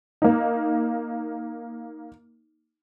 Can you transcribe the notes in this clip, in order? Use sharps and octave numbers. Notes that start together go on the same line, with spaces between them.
A#3 D#4